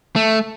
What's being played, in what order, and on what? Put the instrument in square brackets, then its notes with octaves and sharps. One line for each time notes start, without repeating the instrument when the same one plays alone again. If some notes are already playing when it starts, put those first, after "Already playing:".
[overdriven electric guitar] A3